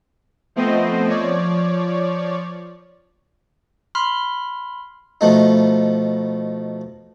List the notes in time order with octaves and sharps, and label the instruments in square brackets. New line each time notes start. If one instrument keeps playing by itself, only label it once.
[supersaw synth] F3 A3 B3 C4 C5 D#5
F3 C#5 D5
[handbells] B5 C6 F6
[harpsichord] B2 F3 A3 D#4